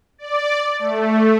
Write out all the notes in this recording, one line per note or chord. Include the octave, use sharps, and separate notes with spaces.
D5
A3